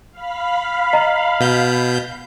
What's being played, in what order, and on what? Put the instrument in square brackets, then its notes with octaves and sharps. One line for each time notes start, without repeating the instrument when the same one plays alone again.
[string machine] F5 B5
[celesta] D#5 A#5
[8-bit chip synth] B2 G6